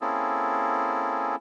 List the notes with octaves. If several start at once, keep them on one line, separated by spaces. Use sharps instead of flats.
A#3 C4 C#4 E4 G#4 A4